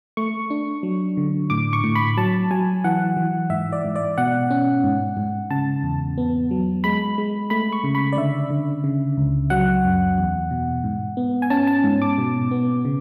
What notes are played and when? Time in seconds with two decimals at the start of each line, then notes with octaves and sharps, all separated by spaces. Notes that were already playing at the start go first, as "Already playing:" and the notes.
0.17 A3 C#6
0.50 D4
0.83 F#3
1.17 D3
1.50 A2 D6
1.73 C#6
1.84 A2
1.95 B5
2.17 F#3 A5
2.51 F#3 G#5
2.84 E3 F#5
3.17 E3
3.50 G#2 E5
3.73 D5
3.84 G#2
3.96 D5
4.18 B2 F#5
4.51 C#4
4.84 G#2
5.17 G#2
5.51 C#3 A5
5.83 E2
6.18 B3
6.51 F#3
6.84 G#3 B5
7.18 G#3
7.50 A3 B5
7.72 C#6
7.84 C#3
7.95 B5
8.13 D5
8.17 D3 E5
8.50 D3
8.84 C#3
9.17 C#2
9.50 F#3 F#5
9.84 F#2
10.18 E2
10.51 B2
10.84 G#2
11.17 B3
11.42 G#5
11.50 C#4 A5
11.67 A5
11.84 G#2
12.02 D6
12.18 B2
12.51 B3
12.85 C#3